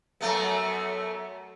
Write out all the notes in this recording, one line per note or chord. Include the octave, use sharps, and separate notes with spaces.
F#2 A3 B3